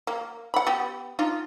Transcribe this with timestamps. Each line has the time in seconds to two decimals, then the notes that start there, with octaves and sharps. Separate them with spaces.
0.07 A#3
0.54 F#5 B5
0.67 B3 G4
1.19 D4 D#4 F4